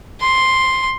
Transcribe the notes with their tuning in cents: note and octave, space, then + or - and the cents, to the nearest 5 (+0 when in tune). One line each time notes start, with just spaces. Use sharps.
C6 +5